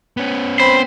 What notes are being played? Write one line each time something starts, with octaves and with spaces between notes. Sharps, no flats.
B3 C#4
C4 C5 B5